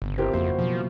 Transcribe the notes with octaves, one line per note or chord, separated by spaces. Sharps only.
G1 C#3 B3
C4 E4 F4 G4 A#4
F2 A#3 F#4 C5
B2 F3 F#3